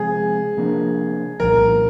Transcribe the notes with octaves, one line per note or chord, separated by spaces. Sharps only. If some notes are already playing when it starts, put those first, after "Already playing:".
Already playing: C3 F3 G#3 C4 G#4
C3 F3 A#3 D4
C2 A#2 F3 A#4